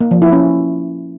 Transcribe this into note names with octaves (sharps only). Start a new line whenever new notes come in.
A#3
F3
E4
C#4